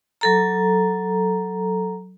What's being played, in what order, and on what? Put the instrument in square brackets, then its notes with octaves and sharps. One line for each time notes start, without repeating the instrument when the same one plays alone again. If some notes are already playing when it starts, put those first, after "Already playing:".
[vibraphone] F#3 A4 A#5